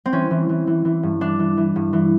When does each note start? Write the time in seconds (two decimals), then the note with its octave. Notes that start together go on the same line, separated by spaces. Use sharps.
0.06 C4
0.12 E3 C#4
0.31 E3
0.49 E3
0.67 E3
0.85 E3
1.03 G2
1.21 E3 D4
1.39 E3
1.57 E3
1.76 G2
1.93 E3